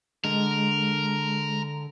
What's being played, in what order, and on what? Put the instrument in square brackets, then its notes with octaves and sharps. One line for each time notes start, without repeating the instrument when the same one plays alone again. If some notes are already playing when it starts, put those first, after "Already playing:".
[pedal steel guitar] D3 [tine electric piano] G#3 [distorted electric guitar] A#4